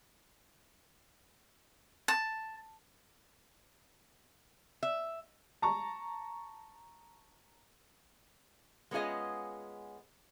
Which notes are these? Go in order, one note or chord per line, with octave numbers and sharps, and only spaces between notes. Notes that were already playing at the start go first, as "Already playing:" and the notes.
A5
E5
A5 A#5 C#6
G#3 B3 C#4 F4 G#4 D#5